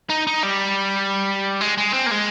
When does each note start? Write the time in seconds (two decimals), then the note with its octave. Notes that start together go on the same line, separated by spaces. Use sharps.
0.10 D#4
0.27 D#4
0.43 G3
1.61 G#3
1.78 G#3
1.93 C4
2.06 A#3
2.11 G#3